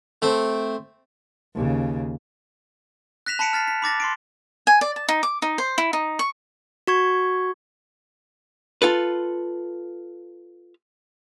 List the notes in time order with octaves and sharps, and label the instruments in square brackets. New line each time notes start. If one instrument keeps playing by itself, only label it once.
[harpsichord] A3 C4
[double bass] D#2 C#3
[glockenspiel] F#6 A#6 B6 E7 F7
A5 B5 B6 C#7 D7 E7
F6 A6 B6 C7
B6
B5 D6 A6 A#6
C6 C7 D7
[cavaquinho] G#5
D5
A5
D#4
D6
D#4
C5
E4
D#4
C#6
[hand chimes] F#4 C#6 G#6
[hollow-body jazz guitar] F4 A4 B4